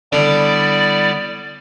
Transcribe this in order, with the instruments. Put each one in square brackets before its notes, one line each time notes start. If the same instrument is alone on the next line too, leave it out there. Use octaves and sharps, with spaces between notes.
[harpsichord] D3 [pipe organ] G3 B3 E4 [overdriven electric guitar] D5